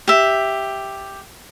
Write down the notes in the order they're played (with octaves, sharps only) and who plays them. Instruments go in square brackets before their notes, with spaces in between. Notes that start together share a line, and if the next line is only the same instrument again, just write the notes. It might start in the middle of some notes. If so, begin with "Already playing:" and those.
[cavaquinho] G4 E5